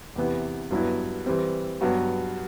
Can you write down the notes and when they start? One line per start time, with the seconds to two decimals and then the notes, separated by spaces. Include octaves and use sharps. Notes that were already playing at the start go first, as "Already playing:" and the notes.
0.16 E2 C3 E3 B3 E4
0.71 G2 F#3 B3 E4
1.26 E3 G3 C4
1.81 G2 F#3 B3 F#4